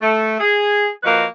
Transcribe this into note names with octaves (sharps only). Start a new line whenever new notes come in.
A3
G#4
F3 A#3 F#4 B4 D#5